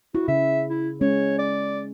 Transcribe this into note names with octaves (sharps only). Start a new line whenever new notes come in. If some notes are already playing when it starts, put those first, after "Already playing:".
E4 F#4
C#3 E5
E4
G#3 C#4 C#5
D5